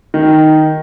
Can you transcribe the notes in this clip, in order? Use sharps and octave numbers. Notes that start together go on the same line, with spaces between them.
D#3